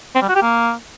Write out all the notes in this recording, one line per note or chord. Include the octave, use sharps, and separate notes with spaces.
C4
G3
F#4
G4
A#3